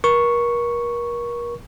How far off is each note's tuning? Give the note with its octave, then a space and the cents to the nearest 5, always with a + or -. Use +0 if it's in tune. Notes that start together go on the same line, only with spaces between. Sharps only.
A#4 +35 C#6 +0